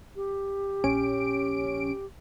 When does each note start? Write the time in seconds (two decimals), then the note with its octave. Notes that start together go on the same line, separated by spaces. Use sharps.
0.16 G4
0.84 A#1 C#4 D7